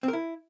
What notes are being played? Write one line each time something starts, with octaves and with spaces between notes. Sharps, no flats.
C4
A#4
E4